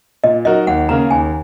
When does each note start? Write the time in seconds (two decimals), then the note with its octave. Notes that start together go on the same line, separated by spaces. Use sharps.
0.24 A#2 D#5
0.45 F#3 D#4 F#4 A#4 D#5
0.67 D#2 F#5
0.89 C#3 A#3 C#4 A#4 A#5
1.11 D#2 G#5